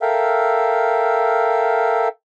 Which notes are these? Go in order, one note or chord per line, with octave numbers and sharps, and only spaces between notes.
A4 A#4 E5 F5 G5